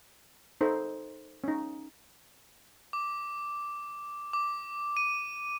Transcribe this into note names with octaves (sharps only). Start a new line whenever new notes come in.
D#4 A4 C5
C#4 D#4
D6
D6
D#7